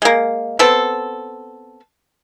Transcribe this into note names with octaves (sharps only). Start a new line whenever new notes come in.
G#3 A#3
B3 C4 A4